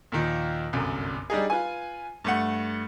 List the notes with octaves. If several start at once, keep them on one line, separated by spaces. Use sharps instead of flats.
D#2 A#2 D#3 F3
G1 C2 F#2
G3 D4 D#4 G#4
F4 B4 G#5
G2 A3 F#5